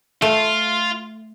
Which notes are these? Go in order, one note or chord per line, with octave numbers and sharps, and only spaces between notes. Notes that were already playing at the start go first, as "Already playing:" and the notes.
A3 F4